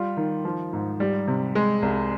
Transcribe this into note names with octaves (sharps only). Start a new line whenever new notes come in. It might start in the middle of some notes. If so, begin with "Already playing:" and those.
Already playing: G3 F4
D#3
F3
G#2
G3
C3
G#3
C2